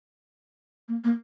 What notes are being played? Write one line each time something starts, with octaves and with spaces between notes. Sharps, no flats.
A#3
A#3